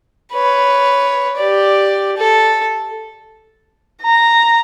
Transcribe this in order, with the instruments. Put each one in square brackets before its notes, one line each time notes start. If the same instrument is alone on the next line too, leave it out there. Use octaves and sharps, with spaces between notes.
[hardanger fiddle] B4 C#5
G4 D5
A4
[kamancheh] A#5